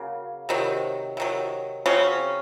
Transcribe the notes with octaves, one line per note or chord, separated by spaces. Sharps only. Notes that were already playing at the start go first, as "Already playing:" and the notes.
Already playing: C#3 F#3 A#3
C3 D#3 F#3
C3 D#3 F#3
C#3 F#3 C4 C#4